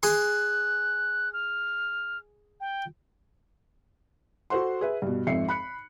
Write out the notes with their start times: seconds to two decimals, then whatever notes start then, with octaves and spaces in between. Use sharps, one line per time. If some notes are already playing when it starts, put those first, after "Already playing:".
0.03 G#4 C6 F#6
1.33 F6
2.60 G5
4.50 F#4 A4 C5 F#5 C6
4.81 G#4 B4 E5
5.02 G2 B2
5.27 G#1 F2 E5 C7 C#7
5.48 B5 F#6 C#7